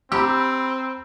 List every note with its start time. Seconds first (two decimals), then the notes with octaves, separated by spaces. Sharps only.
0.12 C4 G4 A#5 B5 E6